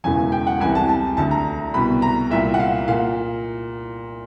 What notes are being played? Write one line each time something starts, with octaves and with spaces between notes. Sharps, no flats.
E1 E2 C#3 E3 G#5
G5
F#5
C2 C3 E3 G#5
A5
A5
D2 D3 A5
A#5
C2 B2 B5
A#5
C2 A#2 E5
F#5
F5
A#2 F5